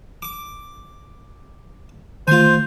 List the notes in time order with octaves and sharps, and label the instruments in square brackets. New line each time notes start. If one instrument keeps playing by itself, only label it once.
[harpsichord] D6
[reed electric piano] D#3 A3 [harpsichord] F4 G#5 [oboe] C5